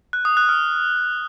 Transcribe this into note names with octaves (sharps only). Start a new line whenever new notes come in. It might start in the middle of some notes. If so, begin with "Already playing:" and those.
F#6
D#6
F#6
F6